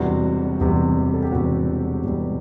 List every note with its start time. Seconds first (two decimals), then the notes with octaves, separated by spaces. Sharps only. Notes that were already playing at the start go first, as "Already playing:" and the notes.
Already playing: E1 E2 C3 G3 F#4
0.60 E1 E2 C3 G3
1.14 A4
1.22 G4
1.32 E1 E2 C3 G3 F#4
2.04 E1 E2 C3 G3